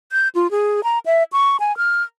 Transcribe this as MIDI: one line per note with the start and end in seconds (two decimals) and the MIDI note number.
0.12 0.28 91
0.35 0.50 65
0.51 0.84 68
0.84 0.99 82
1.06 1.23 76
1.32 1.57 85
1.60 1.75 80
1.77 2.02 89